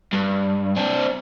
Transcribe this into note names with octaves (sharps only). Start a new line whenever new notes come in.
G2
C4 D4